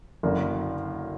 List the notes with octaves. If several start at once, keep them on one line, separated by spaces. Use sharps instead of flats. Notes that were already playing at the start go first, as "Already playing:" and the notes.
F#1 F#2 D3 A#3